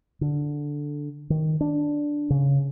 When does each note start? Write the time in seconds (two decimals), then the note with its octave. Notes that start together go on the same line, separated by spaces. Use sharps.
0.21 D3
1.30 D#3
1.61 D4
2.30 C#3